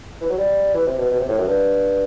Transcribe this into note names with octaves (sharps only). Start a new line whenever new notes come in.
E3
F#3
G3
E3
C3
B2
B2
C3
A2
F#2
G2